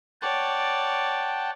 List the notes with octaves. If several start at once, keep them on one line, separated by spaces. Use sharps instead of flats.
C#5 D5 F#5 G5 A5